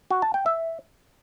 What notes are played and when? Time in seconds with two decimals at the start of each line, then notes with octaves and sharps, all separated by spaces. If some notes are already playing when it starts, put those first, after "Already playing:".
0.11 F#4
0.22 A5
0.34 G5
0.46 E5